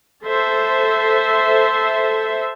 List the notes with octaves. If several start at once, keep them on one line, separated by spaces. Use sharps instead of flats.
A4 C5 E5